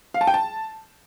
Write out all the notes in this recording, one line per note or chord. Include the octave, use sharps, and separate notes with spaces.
F5
A5
G5
A5